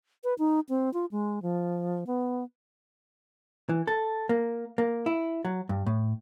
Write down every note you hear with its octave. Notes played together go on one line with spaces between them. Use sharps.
B4
D#4
C4
F4
G#3
F3
B3
E3
A4
A#3
A#3
E4
F#3
G2
A2